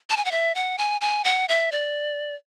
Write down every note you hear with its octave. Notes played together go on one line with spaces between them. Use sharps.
A5
G#5
F#5
E5
F#5
G#5
G#5
F#5
E5
D5